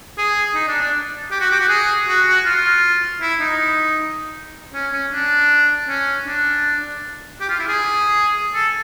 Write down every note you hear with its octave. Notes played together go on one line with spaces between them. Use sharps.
G#4
D#4
D4
D4
G4
F#4
G4
F#4
G#4
F#4
F#4
F4
E4
D#4
C#4
C#4
D4
C#4
D4
G4
F4
E4
G#4
A4